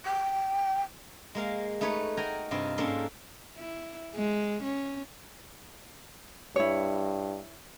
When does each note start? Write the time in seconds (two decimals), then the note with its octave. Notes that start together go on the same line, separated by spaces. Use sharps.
0.05 G5
1.35 G#3 A#3 F5
1.81 A3 D#4 B4 C#5
2.17 F#4 A#4 G5 G#5 A#5
2.51 G2 C3 C4 F4 D#5
2.78 G#2 A#3 C#4 D4 A4 C6
3.57 E4
4.15 G#3
4.63 C#4
6.56 G2 E4 C#5